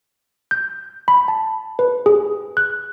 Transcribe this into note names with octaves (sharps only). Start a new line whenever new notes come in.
G6
B5
A5
B4
G#4
F#6